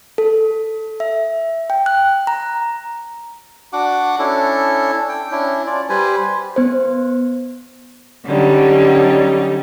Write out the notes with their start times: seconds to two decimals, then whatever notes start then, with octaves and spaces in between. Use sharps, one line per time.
0.18 A4
1.00 E5
1.70 G5
1.86 F#6
2.27 A#5
3.73 D4 F#4 F#5 D6
4.19 C#4 D4 E4 A4
5.09 G5
5.32 C#4 D4 E4
5.66 C#4 F4 D5
5.89 G3 B4 C5 G#5
6.56 B3 C5
8.27 D3 F#3 G3 C#4 D#4